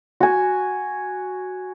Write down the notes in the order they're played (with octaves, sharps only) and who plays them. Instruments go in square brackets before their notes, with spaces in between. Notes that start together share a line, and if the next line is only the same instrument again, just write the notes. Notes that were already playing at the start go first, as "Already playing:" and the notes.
[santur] F#4 G#5